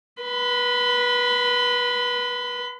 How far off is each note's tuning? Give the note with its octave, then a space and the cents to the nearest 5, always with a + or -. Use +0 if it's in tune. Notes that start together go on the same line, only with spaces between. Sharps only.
B4 -20 B5 +40